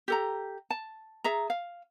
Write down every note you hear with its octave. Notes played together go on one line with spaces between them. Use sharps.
G4 A4 A#5
A5
G#4 E5 A#5
F5